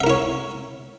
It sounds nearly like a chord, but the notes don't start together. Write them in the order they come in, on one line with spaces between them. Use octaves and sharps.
E5 A#4 E4 C#5